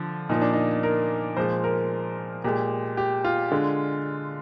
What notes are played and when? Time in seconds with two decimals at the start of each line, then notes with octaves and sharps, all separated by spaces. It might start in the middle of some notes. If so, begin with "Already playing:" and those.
Already playing: D3 F3
0.29 A#2 F3 A#3 D#4
0.42 D4
0.53 D#4
0.83 A#4
1.37 A#2 F3 G#3 C5
1.64 A#4
2.44 A#2 G#3 G4
2.97 G4
3.24 F4
3.52 D3 G#3